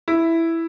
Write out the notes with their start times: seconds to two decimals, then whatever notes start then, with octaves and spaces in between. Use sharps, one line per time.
0.08 E4